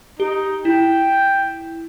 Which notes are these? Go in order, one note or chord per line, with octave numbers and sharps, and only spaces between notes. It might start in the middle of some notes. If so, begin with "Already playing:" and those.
D#4 G4
E4 G5